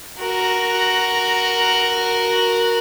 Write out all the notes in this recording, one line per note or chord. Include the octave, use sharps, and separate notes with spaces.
F#4 A#4